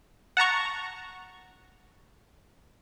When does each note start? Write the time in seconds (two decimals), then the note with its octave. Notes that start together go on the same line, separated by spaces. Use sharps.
0.37 F#5 A5 A#5 C#6